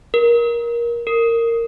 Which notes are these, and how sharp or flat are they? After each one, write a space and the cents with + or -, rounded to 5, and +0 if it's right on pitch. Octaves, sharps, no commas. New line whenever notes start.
A#4 +20
A#4 -15